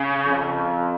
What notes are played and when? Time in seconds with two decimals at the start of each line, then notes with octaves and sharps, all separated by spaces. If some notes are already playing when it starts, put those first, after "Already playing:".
Already playing: C#3
0.26 F2